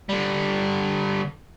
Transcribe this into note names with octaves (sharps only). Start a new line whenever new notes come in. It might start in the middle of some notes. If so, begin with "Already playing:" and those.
D3 G3